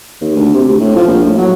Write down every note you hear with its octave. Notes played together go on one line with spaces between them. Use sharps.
D#2
D2
C3
D2
A2
F3
A#1
A2
F#3